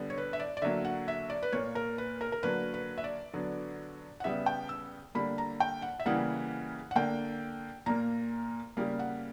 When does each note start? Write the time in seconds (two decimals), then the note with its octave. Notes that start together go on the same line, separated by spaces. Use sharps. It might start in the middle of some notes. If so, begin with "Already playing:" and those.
Already playing: D3 G3 B3
0.10 C#5
0.18 B4
0.33 E5
0.40 D5
0.57 D5
0.62 D3 F#3 A#3 E5
0.85 F#5
1.08 E5
1.30 D5
1.43 B4
1.52 A#2 A#3 C#5
1.75 A#4
1.98 B4
2.21 A#4
2.32 A#4
2.43 D3 F#3 A#3 B4
2.74 B4
2.98 E5
3.04 D5
3.33 D3 F#3 B3
4.20 F#5
4.24 C#3 G3 B3 E5
4.46 G5
4.69 E6
5.15 D3 G3 A#3 B5
5.38 A#5
5.60 G5
5.82 F#5
6.00 E5
6.06 C#3 E3 G3 A#3 F#5
6.91 F#5
6.96 D3 A#3 G5
7.86 A#2 A#3 A#5
8.77 C#3 G3 A#3
8.99 F#5